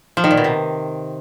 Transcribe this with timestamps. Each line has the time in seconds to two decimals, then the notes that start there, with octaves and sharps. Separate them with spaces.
0.17 F3
0.24 D#3
0.31 A#2
0.37 B2
0.44 C3